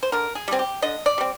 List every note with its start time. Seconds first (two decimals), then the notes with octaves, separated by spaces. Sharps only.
0.03 C5
0.12 D3 A#4
0.35 G#4
0.48 G3 C4 G#4
0.59 G4
0.82 D3 D#5
1.06 D5
1.18 G3 C4